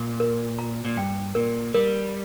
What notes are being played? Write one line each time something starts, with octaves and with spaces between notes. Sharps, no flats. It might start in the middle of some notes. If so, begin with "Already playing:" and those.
Already playing: A#2
A#4
A#5
A#2
G2 G5
A#2 A#4
G3 A#4